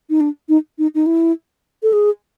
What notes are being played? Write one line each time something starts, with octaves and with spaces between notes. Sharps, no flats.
D#4
D4
D#4
D#4
D#4
E4
A4
G#4